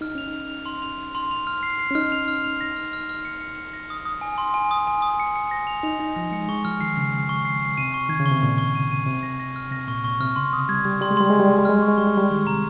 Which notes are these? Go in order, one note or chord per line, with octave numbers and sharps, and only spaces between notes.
D#4 F6
C#4 F7
D#4
F7
F7
C6
F7
F7
C6
F7
F6
C7
C7
C#4
D#4 F6
F7
F6
F7
A#6
F6
F6
F6
C#7
C#7
C#7
A#6
D#6
D#6
G#5
C6
G#5
D#6
G#5
D#6
C#7
C#7
A#6
F7
D#4 F7
D#4 A#6
F3 A#6
G#3 C#7
G#3 C#6
F3 F6
D#3 C7
C#3 C7
C7
C#6
C7
C7
C3 D#7
C#6
D#3 G#6
C#3
C#6
C3
A#2 C#6
C#6
D#7
D#7
C3 D#7
A#6
A#6
F6
C3 A#6
A#2 C#6
A#2 C#6
C3 F6
C#3 C6
C3 D#6
G3 G#6
G3 G#6
G3 C6
G#3
G3 C6
G#3 G#6
G3
G#3 C6
G3
G#3 F6
G3 C#6
G#3
G3 C#6
G#3
G3 C#6
D#3 C#6
C3 A#5